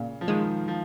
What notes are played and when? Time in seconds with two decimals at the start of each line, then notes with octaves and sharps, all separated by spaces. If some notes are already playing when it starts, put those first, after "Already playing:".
Already playing: A#2 C#3
0.21 F3
0.28 D#3 G#3
0.68 F3